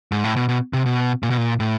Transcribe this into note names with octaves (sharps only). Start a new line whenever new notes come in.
G#2
A2
B2
B2
C3
B2
A#2
B2
A#2
A2